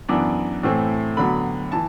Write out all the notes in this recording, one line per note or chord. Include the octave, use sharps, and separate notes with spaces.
F#2 E3 B3 D4 D6
A2 E3 A3 C4
D3 F#3 B3 B5
E3 A5